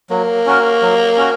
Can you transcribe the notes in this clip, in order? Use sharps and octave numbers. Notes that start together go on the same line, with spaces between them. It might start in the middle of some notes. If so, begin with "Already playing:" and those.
F#3 A#3
C#4 F#4 A#4
F#3
C#4 F#4